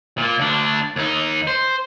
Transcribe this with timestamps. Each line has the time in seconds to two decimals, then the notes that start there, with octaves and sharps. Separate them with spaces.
0.18 A#2 A#3
0.38 D2 D4
0.96 D#2 D#4
1.47 C5